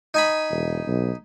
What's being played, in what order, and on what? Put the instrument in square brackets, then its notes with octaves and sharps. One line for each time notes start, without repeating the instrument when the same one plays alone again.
[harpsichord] D#4 G#5 B5
[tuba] E1
B1